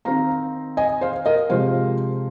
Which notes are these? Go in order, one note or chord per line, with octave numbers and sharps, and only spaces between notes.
D#3 C4 D#4 F5 A#5
D#5 G#5
C5 F5
A#4 D#5
C3 F3 G#3 F4 C5 F5